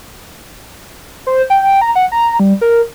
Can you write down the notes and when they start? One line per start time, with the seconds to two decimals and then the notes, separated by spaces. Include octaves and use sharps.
1.27 C5
1.50 G5
1.81 A#5
1.96 F#5
2.12 A#5
2.40 G3
2.61 A#4